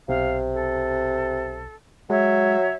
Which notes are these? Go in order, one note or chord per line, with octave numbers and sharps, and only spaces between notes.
B1 C3 F5
A4
F#3 G#3 C#5 E5